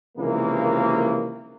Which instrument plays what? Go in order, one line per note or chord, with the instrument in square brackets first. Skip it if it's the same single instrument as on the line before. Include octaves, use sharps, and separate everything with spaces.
[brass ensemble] C#2 C3 D#3 E3 A#3